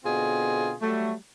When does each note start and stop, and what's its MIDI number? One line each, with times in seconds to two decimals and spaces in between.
0.04 0.74 47
0.04 0.74 50
0.04 0.74 60
0.04 0.74 65
0.04 0.74 68
0.81 1.13 54
0.81 1.13 55
0.81 1.13 57